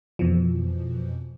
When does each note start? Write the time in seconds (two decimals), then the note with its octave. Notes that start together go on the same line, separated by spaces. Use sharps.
0.19 F2 B2 E3 F3